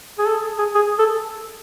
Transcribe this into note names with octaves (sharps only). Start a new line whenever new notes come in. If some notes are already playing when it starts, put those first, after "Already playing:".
G#4
A4
G#4
G#4
A4